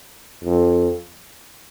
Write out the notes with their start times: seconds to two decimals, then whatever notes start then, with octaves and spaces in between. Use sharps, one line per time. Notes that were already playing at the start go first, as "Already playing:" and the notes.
0.44 F2